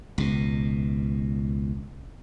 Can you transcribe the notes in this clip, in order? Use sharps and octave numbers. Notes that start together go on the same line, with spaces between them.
C#2 B2